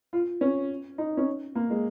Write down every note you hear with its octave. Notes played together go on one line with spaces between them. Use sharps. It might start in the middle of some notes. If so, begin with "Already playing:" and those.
F4
C#4
D#4
C#4
A#3
G#3